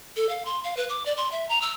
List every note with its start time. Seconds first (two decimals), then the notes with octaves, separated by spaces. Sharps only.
0.17 A4
0.29 F5
0.45 C6
0.64 F5
0.77 B4
0.89 D6
1.06 D5
1.17 C6
1.32 E5
1.49 A#5
1.62 E6